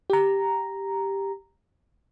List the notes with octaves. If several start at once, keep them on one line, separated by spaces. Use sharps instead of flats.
G4 A#5